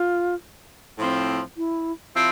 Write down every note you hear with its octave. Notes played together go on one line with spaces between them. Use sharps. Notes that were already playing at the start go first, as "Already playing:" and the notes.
Already playing: F4
A2 F3 C4
E4
F3 C4 E4